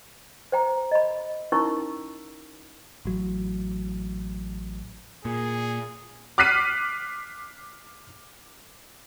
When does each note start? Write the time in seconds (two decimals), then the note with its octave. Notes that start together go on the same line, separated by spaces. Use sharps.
0.52 C5 G5 A#5
0.91 D#5 B5
1.52 C#4 D#4 E4 A#4 C#6 E6
3.05 A1 F#3
5.25 A#2 G#4
6.38 D6 F6 F#6 B6 C7 D#7